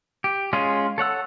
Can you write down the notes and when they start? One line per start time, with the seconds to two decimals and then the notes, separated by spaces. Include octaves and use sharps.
0.24 G4
0.53 G#3 C#4 F4 G#4
0.98 A4 C#5 F#5 E6